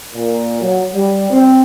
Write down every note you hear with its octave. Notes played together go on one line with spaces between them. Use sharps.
A#2
F#3
G3
C4